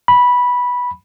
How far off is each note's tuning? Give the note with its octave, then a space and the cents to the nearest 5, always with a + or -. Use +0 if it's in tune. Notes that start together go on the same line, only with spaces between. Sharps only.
B5 -10